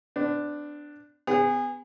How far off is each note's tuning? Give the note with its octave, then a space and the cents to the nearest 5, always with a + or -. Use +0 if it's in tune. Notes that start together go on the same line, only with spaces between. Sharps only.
B3 +45 D4 +5
B3 +30 G#4 -25